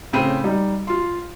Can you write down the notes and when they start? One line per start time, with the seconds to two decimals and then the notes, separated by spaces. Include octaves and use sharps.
0.13 A2 C#3 C4 B5 D#7
0.44 G3 D#4
0.87 F4 C6